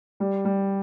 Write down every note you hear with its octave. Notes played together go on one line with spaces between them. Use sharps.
G3
G3